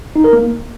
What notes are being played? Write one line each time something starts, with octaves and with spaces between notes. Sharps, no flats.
D#4
A#4
A#3